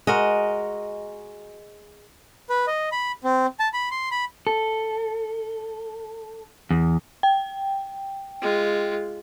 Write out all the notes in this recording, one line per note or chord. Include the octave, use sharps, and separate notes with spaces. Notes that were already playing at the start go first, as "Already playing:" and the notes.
G#3 F#4 A#4 D#5
B4
D#5
B5
C4
A5
B5
C6
B5
A4
E2
G5
G#3 F4